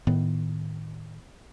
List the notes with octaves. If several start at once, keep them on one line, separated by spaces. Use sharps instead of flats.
A2 D#3 B3